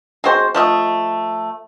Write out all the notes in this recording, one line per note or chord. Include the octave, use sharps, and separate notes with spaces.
G#3 C4 F#4 C5
F3 A3 D#5